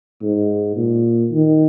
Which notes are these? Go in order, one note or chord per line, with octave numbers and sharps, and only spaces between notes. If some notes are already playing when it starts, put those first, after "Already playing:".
G#2
A#2
D#3